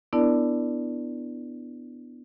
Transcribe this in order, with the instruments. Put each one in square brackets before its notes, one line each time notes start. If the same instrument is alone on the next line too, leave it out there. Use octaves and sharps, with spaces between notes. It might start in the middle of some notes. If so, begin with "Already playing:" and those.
[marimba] B3 D4 E4 A#4 D5 A5